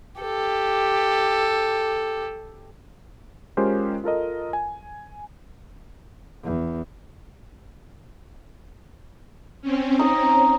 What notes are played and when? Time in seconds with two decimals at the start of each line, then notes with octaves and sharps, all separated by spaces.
0.21 G4 A4
3.57 G#3 C#4 F4 G4 A#4 C5
4.04 F4 A4 A#4 D#5
4.53 G#5
6.44 E2
9.62 C4 C#4
9.99 D#4 D#5 A#5